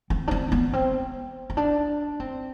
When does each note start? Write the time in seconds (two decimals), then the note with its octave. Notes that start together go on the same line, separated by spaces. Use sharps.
0.10 C4
0.28 D4
0.31 C4
0.52 B3
0.73 C4
1.50 C4
1.57 D4
2.20 C4